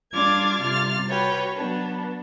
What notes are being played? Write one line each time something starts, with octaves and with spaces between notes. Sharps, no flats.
G3 D4 F4 D6 F6 G#6
C3 G3 F4 F6 A6
F#4 B4 C#5 G5
F#3 B3 D4